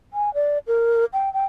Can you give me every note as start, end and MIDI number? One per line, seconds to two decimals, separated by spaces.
0.13 0.33 80
0.34 0.58 74
0.67 1.05 70
1.13 1.32 79
1.33 1.45 79